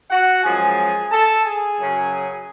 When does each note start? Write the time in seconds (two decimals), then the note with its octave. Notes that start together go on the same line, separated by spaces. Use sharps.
0.11 F#4 F#5
0.44 F#2 F3 G#3 G#4 G#5
1.11 A4 A5
1.45 G#4 G#5
1.79 F#2 C#3 F#3